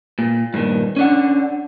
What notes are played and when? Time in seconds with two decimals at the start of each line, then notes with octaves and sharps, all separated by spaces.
0.19 A#2
0.54 G2 A#2 D#3
0.96 C#4 D4 F#5